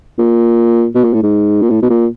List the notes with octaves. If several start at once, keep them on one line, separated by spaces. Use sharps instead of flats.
A#2
B2
A#2
A2
G#2
A#2
A2
B2
A#2